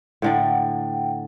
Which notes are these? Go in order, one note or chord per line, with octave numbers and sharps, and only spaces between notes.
A2 D3 D5 F#5 G5